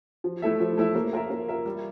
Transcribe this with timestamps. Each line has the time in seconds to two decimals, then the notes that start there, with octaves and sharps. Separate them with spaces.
0.24 F3
0.42 A3 E4 A4 E5
0.60 F3
0.78 A3 E4 A4 E5
0.95 A#3
1.13 F4 A#4 E5
1.30 A#3
1.48 F4 A#4 E5
1.65 G3